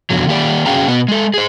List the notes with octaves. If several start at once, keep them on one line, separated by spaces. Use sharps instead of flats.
F2 B2 D3 F#3
D#3 A#3 G4 D5
C#4 F#4 G#4 F5 G5 A#5
B2 B3
G#3 A4
G#4 C5